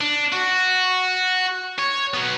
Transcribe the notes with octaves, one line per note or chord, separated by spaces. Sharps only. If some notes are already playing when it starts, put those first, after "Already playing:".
D4
F#4
C#5
F#3 B3